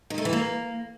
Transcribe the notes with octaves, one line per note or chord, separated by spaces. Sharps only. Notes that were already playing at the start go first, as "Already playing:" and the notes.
D#3
A3
E3
A#3